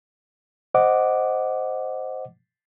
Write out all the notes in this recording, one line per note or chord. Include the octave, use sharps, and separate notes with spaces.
C5 D#5 F#5 D6